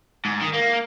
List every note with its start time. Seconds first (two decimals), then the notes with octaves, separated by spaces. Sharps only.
0.25 G#2
0.41 D#3
0.53 A#3